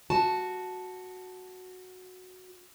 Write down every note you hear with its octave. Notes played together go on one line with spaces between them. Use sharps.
F#4 A5